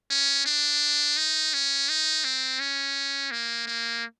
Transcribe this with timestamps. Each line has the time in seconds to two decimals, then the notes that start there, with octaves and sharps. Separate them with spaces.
0.11 C#4
0.46 D4
1.17 D#4
1.54 C#4
1.89 D#4
2.25 C4
2.60 C#4
3.32 A#3
3.67 A#3